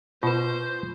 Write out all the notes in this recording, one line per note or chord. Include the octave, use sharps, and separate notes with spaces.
B2 F4 B4 C5